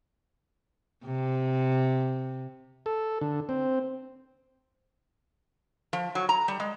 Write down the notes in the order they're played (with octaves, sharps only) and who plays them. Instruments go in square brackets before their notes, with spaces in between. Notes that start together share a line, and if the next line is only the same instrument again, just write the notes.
[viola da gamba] C3
[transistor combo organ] A4
D3
C4
[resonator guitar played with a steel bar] F3
F#3
A#5
G3
G#3